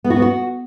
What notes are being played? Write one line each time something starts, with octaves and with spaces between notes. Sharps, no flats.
B3
F#4
B3
F#4